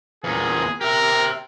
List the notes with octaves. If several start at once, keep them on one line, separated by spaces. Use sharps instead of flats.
E2 A#2 G#4
G4 A#4 E5